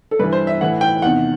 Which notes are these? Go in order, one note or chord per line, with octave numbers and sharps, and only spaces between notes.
A4
G2 E3 B4
C5
E5
A2 E3 F#5
G5
E2 C3 D#3 F#5